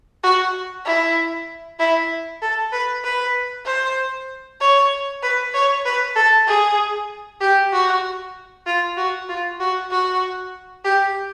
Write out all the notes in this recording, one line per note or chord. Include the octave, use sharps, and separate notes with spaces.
F#4
E4
E4
A4
B4
B4
C5
C#5
B4
C#5
B4
A4
G#4
G4
F#4
F4
F#4
F4
F#4
F#4
G4